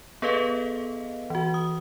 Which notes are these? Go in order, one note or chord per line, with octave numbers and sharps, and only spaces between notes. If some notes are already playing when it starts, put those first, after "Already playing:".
B3 G#4 A4 B4 D#5 F5
E3 F#4
D#6